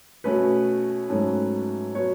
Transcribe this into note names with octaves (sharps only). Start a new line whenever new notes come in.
B2 A3 C#4 B4
G#2 F#3 A3 C#4
B2 F#3 B3 C#5